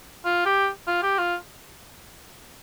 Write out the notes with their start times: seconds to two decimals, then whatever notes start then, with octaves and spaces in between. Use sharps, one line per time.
0.25 F4
0.46 G4
0.87 F4
1.03 G4
1.18 F4